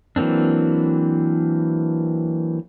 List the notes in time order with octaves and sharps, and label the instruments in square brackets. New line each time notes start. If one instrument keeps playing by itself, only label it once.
[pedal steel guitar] E3 F#3 A#3 C4 D4